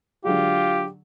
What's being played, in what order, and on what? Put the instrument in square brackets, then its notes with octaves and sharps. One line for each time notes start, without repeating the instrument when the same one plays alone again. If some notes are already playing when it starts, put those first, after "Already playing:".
[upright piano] D3 F#3 G#3 [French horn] F4 [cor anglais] G4